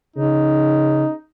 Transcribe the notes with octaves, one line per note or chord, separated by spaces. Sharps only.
C#3 D#4